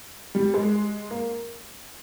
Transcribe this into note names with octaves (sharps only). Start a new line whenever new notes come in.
G3
G#3
A#3